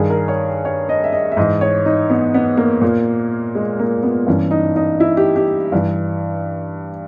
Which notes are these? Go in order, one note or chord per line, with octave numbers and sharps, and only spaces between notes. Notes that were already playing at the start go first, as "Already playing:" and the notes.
Already playing: G2 D#3 G#4
A#4
C#5
C#5
D#5
E5
D#5
E5
G#2 E3 D#5
C#5
D#4
B3
B3
A#3
A#2
G#3
A#3
B3
G2 E3 C#4
D#4
D#4
E4
G4
G4
G2 E3